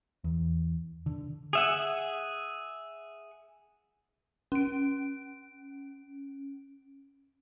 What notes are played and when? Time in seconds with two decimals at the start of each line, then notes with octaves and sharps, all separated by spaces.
0.24 E2
1.06 D3
1.53 G#4 E5 F#5
4.52 C#4 D7